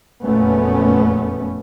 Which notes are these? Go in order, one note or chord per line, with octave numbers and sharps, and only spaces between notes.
F#1 F2 A#2 A3 B3 C#4